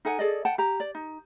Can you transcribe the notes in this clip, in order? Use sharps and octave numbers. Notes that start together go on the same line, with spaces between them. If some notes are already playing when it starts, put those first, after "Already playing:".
D#4 A4 F#5 G#5
G#4 A4 D5 D#5
F#5 G5 A5
G4 A#5
D5
D#4